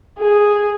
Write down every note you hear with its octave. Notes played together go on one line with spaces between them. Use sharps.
G#4